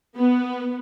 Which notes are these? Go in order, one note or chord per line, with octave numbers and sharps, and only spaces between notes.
B3